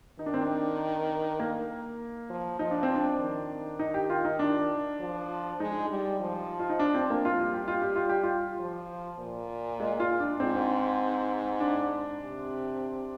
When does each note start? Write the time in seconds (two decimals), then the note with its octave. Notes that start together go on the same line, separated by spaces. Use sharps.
0.19 D#3 D#4
0.26 D4
0.34 C4
0.41 D4
1.39 A#3
2.30 F3
2.59 F3 D#4
2.71 D4
2.83 C4
2.95 D4
3.20 D#3
3.79 D#4
3.94 G4
4.10 F4
4.25 D#4
4.39 D4
5.00 F3
5.60 G#3 D#4
5.90 G3
6.20 F3
6.59 F4
6.69 D#4
6.79 D4
6.94 C4
7.10 A#3
7.25 F4
7.40 G3 F4
7.54 G4
7.68 F4
7.82 G4
7.96 F4
8.09 G4
8.23 F4
8.60 F3
9.19 A#2
9.80 G#3
10.00 F4
10.20 D4
10.40 G#2 C4
11.60 D4
12.20 C3